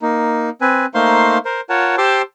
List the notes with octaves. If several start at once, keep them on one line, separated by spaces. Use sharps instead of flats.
A#3 D#4
C4 B4 G#5
A3 A#3 D#4 C5 F5 C6
A#4 C5
F4 A#4 C#5 F#5 A5
G4 C5 A5 C6 D6 E6